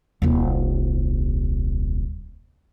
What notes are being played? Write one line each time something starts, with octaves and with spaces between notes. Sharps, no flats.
D#1 C2